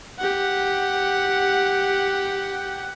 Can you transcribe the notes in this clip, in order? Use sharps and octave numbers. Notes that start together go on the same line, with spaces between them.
G4 F#5